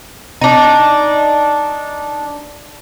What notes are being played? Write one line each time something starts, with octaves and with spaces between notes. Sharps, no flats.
D4 D#4